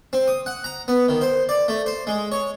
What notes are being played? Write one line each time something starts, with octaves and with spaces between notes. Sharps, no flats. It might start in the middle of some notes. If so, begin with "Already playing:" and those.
C4
D#6
F#5
A#5
B3
D#3
C5
D5
A3
C5
G#3
C#5